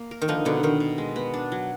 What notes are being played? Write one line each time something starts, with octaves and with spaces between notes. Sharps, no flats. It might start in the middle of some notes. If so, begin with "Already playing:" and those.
Already playing: A#3
A#4
D#3
D3 F3 D#4
B2 D3
B2 D#3
B2
G#3
B3
D4
F#3